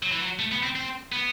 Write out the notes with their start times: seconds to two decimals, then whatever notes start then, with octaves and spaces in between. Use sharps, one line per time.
0.03 F#3
0.12 E3
0.22 F#3
0.39 A3
0.52 B3
0.63 C4
0.76 C4
1.12 B3